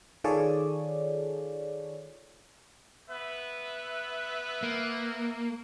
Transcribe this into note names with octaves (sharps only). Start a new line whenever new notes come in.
D#3 F4 G#4 A4 C#5 D5
B3 B4 E5
A#3